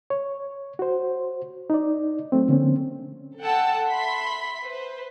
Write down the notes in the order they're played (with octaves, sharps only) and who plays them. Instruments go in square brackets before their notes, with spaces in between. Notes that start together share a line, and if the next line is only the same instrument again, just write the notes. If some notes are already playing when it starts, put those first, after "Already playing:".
[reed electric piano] C#5
F#4 C5
D#4 D5
F#3 A3 C4
D3 F3 A#3 C4 C#4
[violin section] A4 F#5 G5 A5 E6
E5 B5 C6 B6
B4 C5